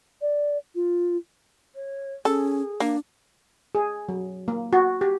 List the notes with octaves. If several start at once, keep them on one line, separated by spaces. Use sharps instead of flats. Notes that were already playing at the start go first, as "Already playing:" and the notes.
D5
F4
C#5
C#4 G#4 A4
A#3 D4
G#4
F#3
A#3
F#4
G4